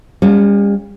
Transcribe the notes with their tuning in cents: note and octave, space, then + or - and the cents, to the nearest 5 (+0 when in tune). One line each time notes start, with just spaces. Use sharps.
G3 +45 C#4 +10 F4 +35